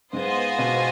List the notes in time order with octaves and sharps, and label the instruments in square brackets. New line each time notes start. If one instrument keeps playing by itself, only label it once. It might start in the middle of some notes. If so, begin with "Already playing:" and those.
[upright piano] G#2 [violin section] B3 F4 C5 D#5 G#5
[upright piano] B2